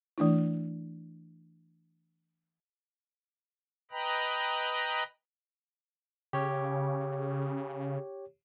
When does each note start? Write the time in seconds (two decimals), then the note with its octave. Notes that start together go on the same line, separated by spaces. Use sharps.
0.18 E3 A3 D4 E4
3.91 B4 D#5 G5 A#5 B5
6.33 C#3 G4 C#5